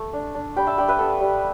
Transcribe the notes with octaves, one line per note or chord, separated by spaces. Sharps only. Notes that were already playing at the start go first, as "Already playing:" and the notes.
Already playing: A3
D4
D4
G3 G5 B5
E5 A5
D4 D5 G5
B4 E5
B3 A4
G3